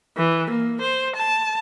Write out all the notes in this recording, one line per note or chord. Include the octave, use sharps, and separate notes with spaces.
E3
A#3
C5
A5